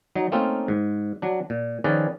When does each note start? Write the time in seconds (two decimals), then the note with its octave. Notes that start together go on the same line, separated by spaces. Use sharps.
0.16 F#3 D#4
0.32 A3 A#3 C4 C#4 D#4 F4
0.68 G#2
1.22 F#3 D4
1.50 A#2
1.84 D#3 F3 C#4 G#4 B4 D5